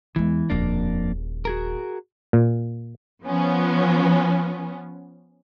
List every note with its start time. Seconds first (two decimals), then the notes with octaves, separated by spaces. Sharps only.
0.16 E2 E3 G#3
0.50 D#1 A#1 F2 A#3 D4
1.45 F#4 G#4 A#4
2.33 A#2
3.24 F3 B3 C#4